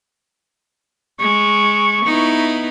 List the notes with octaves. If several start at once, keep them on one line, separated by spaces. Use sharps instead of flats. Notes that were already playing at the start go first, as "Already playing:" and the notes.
G#3 C#6
B3 D#4 E4